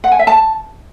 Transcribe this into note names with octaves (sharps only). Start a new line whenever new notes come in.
F#5
G#5
E5
A5